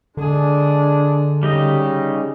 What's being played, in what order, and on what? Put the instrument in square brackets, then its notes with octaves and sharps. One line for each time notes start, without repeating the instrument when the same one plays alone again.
[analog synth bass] D3 [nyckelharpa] G#3 G#4 [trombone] D4
[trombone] C#3 [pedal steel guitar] G3 D#4 D#5 [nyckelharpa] G4